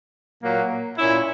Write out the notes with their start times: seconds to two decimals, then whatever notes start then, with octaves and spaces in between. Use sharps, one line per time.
0.43 A#2 F#3 A#3
0.98 A#2 A#3 C#4 E4